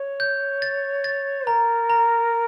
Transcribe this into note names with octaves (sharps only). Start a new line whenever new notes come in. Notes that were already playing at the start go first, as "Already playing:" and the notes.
Already playing: C#5
G6
A6
A6
A#4 A#5
A#5